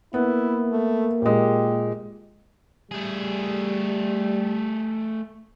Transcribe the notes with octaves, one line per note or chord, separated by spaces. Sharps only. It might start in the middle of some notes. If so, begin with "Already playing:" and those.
A#3 B3 E4
A3
A#2 G#3 G4
G3 A3 G#4